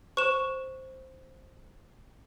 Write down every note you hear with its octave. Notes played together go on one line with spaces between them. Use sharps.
C5 C#6 E7